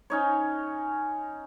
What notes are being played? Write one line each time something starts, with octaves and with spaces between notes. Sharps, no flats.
C#4 D#4 C#5